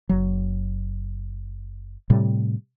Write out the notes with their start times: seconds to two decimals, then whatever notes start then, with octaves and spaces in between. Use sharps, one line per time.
0.09 F#1 F#3
2.10 A2 C3 G3